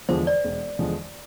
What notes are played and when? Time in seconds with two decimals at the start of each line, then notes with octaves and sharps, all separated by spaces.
0.09 E2 D3 F3 G#3 C5
0.27 D5
0.44 E1
0.79 E2 D3 F3 G#3